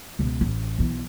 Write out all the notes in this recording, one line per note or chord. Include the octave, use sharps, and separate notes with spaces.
C#2 B2
A1
B1 E3